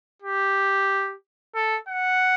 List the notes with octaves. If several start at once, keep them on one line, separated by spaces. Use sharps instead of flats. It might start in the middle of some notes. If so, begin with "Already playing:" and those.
G4
A4
F#5